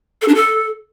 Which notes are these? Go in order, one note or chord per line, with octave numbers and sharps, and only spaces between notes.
A4
D4
A4